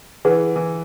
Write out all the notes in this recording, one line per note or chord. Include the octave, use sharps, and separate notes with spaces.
E3 G#4 B4 F#5
E3